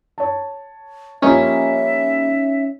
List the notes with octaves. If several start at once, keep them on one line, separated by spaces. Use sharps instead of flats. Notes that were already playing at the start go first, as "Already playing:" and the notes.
C#5 A5
F3 G3 A#3 C#4 D#4 E5